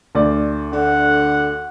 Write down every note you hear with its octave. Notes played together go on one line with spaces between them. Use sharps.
D2 D5
D3 F#5